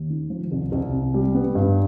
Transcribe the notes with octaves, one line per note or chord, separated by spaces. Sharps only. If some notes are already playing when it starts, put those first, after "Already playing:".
Already playing: D#2
D#3
F3
C2
C2
C3
G3
B3
G2